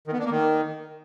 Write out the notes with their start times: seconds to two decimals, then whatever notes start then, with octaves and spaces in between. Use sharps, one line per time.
0.07 D#3
0.13 B3
0.19 D4
0.25 A#3
0.31 D#3